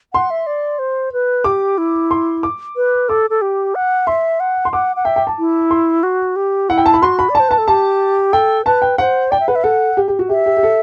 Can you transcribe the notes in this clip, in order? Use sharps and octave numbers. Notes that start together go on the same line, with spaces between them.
F#5 C6
E5
D5
C5
B4
G4 D6
E4
C6
D6
B4
A4 D6
A4
G4
F#5
E5 C6
F#5
C6
F#5 D6
F#5
E5 G5
G5
A5
E4
C6
F#4
G4
E4 F#5
G5
A5
B5
F#4 C6
B5
D5
C5 A5
B4 A5
A4
G4 A5
A4 G5
B4 A5
G5
C5 F#5
D5 G5
E5
B4 F#5
E5
A4 F#5
G4
G4
F#4
G4 E5
G4
G4
A4